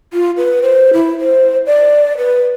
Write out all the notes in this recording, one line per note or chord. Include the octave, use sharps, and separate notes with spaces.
F4
B4
C5
E4
C5
D5
B4